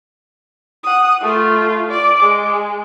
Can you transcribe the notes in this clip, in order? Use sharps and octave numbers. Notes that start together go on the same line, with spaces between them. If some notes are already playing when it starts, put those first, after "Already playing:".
F#5 D#6
A3 F4
D5 D6
G#3